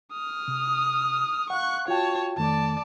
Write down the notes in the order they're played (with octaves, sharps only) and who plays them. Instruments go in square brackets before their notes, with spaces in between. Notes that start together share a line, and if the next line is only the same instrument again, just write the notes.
[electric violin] D#6 F6
[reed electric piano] C3
[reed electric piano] F5 F#5 [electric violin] C#6 F#6
[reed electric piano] F4 F#4 G5 [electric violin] C#5 A5
[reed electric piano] F2 D#3 A3 [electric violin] D5 A5